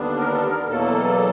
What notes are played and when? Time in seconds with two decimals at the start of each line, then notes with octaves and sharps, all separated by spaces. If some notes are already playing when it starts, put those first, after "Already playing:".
Already playing: D#2 D3 G3 B3 D4
0.18 A#4
0.32 A4
0.46 A#4
0.68 E2 B2 F#3 A#3 A4